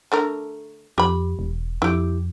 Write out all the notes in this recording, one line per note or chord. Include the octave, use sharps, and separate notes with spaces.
D3 A3 A#4
F2 G4 B5
E1
F2 E4 G4